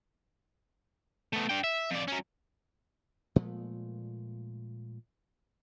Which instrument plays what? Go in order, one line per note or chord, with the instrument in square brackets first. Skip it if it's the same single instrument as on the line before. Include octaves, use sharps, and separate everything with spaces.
[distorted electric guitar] A3 B3
D4 G5
E5
F2 D5
F#3 C#4
[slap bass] A#2 F3 G#3 A3